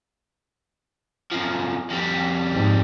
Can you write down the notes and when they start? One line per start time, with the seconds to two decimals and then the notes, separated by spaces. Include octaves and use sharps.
1.32 F#2 F3
1.90 F2 G3
2.53 G#2